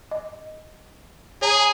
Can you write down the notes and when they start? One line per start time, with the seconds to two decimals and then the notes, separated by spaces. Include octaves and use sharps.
0.11 D#5
1.42 G#4 C#5 A5 A#5